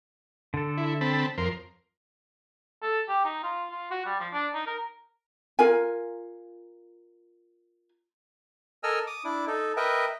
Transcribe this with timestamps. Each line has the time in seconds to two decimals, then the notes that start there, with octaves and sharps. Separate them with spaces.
0.54 D3 A4
0.78 E4
1.01 C4 A5 B5
1.38 F2 A#4 C6
2.82 A4
3.09 G4
3.25 D#4
3.43 F4
3.71 F4
3.91 F#4
4.06 G3
4.20 F3
4.33 D4
4.54 D#4
4.67 A#4
5.59 F4 A#4 G#5
8.83 A4 A#4 D#5 G#5 E6 F6
9.07 D6 D#6
9.24 D4 E4 D6
9.47 D#4 A4
9.77 A#4 B4 D#5 E5 G5